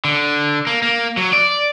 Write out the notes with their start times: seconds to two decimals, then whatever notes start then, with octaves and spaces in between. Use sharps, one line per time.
0.05 D3
0.67 A#3
0.82 A#3
1.17 F#3
1.33 D5